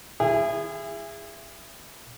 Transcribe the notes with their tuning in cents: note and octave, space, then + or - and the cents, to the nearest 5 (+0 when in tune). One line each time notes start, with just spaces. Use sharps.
E4 +25 G#4 -25